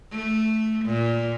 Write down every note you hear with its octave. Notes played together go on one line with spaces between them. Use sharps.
A3
A#2